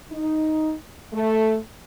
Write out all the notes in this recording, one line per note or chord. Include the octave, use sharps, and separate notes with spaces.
D#4
A3